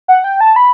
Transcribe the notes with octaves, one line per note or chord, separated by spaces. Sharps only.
F#5
G5
A5
B5